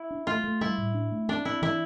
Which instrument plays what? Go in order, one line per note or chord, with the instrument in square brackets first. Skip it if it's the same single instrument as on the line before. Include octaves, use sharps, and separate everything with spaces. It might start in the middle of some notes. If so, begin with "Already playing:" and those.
Already playing: [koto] E4
[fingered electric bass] D4
[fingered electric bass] A3 [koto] F4
[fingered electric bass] A3
[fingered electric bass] G3 [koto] E4
[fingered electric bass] A2
D4
A3
[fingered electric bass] C4 [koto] D4
[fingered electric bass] C4 [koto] E4
[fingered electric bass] E3 [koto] E4